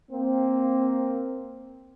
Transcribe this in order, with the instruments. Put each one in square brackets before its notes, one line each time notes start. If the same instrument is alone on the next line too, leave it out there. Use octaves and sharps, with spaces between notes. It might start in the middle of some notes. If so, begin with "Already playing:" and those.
[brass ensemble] A#3 C4